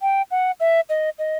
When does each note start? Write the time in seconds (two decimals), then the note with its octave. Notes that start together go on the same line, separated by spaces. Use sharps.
0.02 G5
0.31 F#5
0.60 E5
0.89 D#5
1.19 D#5